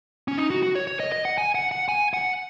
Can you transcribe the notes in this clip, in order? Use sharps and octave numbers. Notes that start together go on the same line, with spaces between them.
C#4
D#4
F#4
F#4
C#5
C#5
D#5
D#5
F#5
G#5
F#5
F#5
G#5
F#5